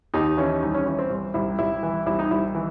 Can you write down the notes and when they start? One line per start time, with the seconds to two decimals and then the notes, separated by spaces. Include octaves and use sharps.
0.14 D#2 D#4
0.37 E3 C#4
0.62 C2 D#4
0.74 C#4
0.86 E3 C#4
0.99 C4
1.10 C2
1.34 C2 E4
1.59 C2 E4
1.83 E3
2.06 C2 E4
2.19 D#4
2.31 C2 E4
2.55 E3